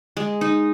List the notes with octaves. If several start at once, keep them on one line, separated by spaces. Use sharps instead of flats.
G#3
D#4